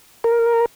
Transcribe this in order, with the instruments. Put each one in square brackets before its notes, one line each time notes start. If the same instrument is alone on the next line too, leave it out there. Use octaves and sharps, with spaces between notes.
[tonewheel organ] A#4